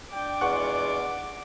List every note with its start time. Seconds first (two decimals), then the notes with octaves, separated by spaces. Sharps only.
0.11 D4 G5 D6
0.41 E2 G#3 F4 F#4 F#5 C#6